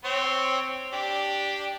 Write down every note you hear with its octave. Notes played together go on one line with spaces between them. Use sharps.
C4 C#5
D4 G4